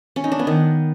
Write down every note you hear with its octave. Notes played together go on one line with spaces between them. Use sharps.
C#4
D#4
D4
B3
D#3